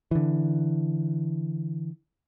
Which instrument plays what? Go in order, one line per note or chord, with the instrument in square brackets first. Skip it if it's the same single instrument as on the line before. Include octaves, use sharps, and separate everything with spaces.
[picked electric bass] D3 E3